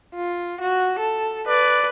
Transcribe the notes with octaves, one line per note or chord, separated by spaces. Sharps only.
F4
F#4
A4
B4 D5